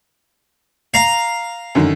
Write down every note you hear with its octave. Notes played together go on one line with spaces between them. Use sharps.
F5 A#5
F#2 D3 D#3